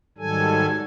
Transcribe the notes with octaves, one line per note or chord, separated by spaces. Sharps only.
G#2 D#3 F#3 G3 A4 G#5